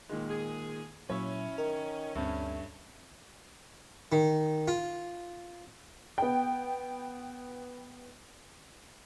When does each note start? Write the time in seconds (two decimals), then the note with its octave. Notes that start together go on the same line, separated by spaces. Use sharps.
0.09 A#2 D#3 G#3
0.30 G#4
1.10 A#2 F#3 C#4 E4 C#5 E5
1.58 D#3 A#4
2.15 D2 G2 A3 C4
4.12 D#3
4.68 F4
6.18 B3 G5